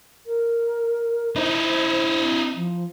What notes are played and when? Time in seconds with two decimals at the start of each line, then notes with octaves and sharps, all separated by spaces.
0.26 A#4
1.36 D#4 E4 C5
2.21 C4
2.55 F3